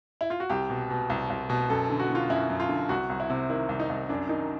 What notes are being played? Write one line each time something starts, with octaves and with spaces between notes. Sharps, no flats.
E4
F4
F#4
C2 G4
B2
B2
C2
C2
B2
F#2 A4
D3
F#4
D3
F4
F#2 E4
F#2
F4
D3
C2 F#4
C2
E4
C3
D#3 E4
C2
D#4
C2
F#2 D4
D#3 D#4